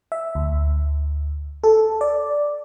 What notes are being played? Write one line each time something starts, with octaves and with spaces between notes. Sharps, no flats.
E5
D2
A4
D5